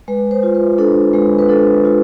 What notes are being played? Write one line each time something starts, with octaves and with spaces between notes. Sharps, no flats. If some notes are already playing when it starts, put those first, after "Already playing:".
G#3 B4
C5
F4
B4
D4 A4
G#3 B4
B4
D4 A4
F4